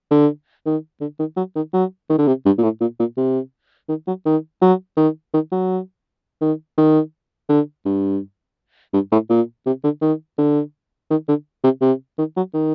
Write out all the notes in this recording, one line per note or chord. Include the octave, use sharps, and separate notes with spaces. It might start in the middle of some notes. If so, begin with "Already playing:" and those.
D3
D#3
D3
D#3
F#3
D#3
F#3
D#3
D3
C3
G2
A#2
A2
A#2
A#2
C3
D#3
F#3
D#3
F#3
D#3
D#3
F#3
D#3
D#3
D3
G2
G2
A2
A#2
C3
D3
D#3
D3
D#3
D3
C3
C3
D#3
F#3
D#3